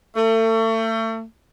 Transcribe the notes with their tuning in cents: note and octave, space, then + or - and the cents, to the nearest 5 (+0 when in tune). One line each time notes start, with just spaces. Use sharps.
A3 +35